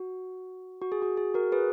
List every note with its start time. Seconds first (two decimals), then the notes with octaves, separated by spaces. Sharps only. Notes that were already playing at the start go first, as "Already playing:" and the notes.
Already playing: F#4
0.82 F#4
0.92 G#4
1.02 F#4
1.17 G#4
1.34 F#4 A#4
1.52 G#4 B4